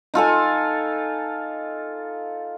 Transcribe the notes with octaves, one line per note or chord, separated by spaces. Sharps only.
D#4 F4 A4 G#5